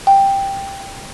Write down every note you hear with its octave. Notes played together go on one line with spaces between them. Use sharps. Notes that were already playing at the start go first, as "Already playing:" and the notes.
G5